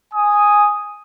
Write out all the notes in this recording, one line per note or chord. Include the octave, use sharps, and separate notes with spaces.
G#5 D#6